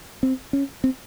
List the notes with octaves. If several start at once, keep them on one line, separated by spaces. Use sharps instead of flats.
C4
C#4
C4